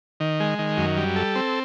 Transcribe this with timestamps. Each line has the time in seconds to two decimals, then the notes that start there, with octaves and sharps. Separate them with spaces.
0.20 D#3
0.40 G#3
0.59 D#3
0.77 F#2
0.97 G3
1.16 A4
1.35 C4